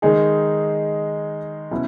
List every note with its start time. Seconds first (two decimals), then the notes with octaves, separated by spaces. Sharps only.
0.02 D#3 G#3 D#4 G#4
1.71 B2 F#3 C#4 E4